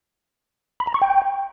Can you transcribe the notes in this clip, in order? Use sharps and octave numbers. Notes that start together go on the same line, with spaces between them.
B5
A#5
C#6
G5